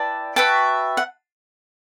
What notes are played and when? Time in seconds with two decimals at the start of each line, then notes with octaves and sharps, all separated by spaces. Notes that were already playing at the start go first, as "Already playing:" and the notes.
Already playing: E4 B4 D5 G5 A5
0.36 F#4 B4 E5 G5 A5
0.97 F#5